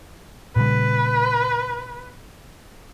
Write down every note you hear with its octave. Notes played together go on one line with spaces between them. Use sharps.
A#2 C#3 G3 B4